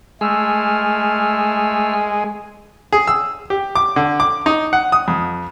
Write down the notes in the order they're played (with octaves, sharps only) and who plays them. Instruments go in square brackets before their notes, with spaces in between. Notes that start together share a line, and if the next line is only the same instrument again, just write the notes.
[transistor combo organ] G#3 [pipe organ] A3 E6 F6
[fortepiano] G#4
E6
G4
D6
D3
D6
D#4
F#5
D#6
F2